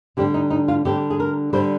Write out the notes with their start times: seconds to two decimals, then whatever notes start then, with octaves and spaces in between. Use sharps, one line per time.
0.17 D3 G3 D4 G4
0.34 D#4
0.50 D#4
0.68 F4
0.85 D3 G3 D4 G4
1.10 G#4
1.20 A#4
1.53 D3 G3 D4 C5